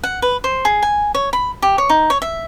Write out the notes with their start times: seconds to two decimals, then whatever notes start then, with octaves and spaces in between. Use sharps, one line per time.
0.03 F#5
0.22 B4
0.44 C5
0.65 G#4
0.82 G#5
1.14 C#5
1.33 B5
1.62 G4
1.78 C#5
1.89 D#4
2.10 C#5
2.22 E5